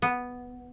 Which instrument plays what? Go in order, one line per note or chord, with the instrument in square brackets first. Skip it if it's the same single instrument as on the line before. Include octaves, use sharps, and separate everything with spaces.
[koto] B3